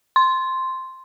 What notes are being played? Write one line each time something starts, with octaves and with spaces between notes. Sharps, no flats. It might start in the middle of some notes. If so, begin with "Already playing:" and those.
C6